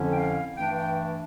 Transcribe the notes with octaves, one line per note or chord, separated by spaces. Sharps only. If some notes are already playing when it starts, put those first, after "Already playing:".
Already playing: F2 D3 F3 C#4 E4
G5
F5
G2 E3 A3 D4 G5
G5